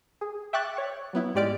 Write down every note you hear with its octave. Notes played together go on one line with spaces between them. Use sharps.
G#4
E5 G5 C#6 D6 F#6 A6
C#5 C#6
F#3 B3 E4
G#2 G#3 G4 D5 F6 D7